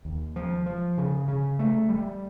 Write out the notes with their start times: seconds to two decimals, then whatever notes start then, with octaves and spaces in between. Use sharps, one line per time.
0.05 D#2
0.36 F3
0.66 F3
0.98 C#3
1.28 C#3
1.59 A3
1.89 G3